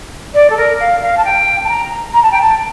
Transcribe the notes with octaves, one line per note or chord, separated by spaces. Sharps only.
D5
A4
A#4
F5
F5
A5
G5
A5
A#5
A#5
A5
G5
A5